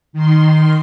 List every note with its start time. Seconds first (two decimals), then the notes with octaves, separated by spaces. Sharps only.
0.13 D#3 C6